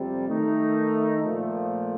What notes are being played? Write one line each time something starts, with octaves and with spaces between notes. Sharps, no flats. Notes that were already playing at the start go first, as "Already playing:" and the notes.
Already playing: F2 C3 G3
D#3 A3 D#4
A#2 F3 A3